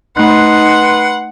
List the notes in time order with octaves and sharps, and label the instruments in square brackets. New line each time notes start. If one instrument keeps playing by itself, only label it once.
[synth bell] A3 F#6 [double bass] D#4 [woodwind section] B4 C6 [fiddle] F#5